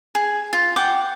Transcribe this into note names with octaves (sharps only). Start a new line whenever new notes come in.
G#4
F4
F#5 G5 D6